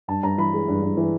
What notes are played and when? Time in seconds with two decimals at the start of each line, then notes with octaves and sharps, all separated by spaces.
0.08 G2 A5
0.23 G2 A#5
0.38 E3 B5
0.53 G#3
0.68 G2
0.83 G2
0.97 E3